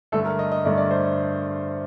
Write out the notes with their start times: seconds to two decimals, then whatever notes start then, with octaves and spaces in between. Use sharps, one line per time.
0.12 G2 D3 A3 A4
0.25 A#4
0.39 D#5
0.52 D#5
0.65 G2 D3 A3 D5
0.77 D5
0.91 C5